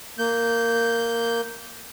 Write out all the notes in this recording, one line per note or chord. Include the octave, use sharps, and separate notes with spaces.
A#3 G6